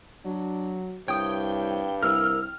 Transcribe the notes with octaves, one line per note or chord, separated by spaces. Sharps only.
F#3 D4
C2 G2 C#5 G5 D#6
C2 A#4 E6 F6